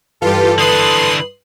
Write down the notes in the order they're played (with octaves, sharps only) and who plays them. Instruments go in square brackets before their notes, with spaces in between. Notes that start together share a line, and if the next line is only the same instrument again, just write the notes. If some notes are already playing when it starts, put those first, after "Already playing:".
[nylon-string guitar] G2 E3 [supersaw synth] F4 G4 [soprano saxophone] A4
[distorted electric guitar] D3 B4 [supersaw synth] C6 D#6 C7